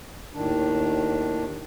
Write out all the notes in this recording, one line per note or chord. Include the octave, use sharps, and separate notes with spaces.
D#2 A2 D#3 D4